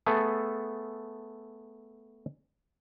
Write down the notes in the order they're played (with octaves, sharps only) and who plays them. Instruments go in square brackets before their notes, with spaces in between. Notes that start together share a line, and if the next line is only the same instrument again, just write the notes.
[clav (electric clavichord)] A3 B3 G#4 A4